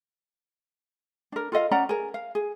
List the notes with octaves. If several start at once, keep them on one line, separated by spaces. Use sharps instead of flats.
D4 A#4
F4 A4 D#5 F5
C#4 D5 F#5 A#5
G#4 A#4
F5
G#4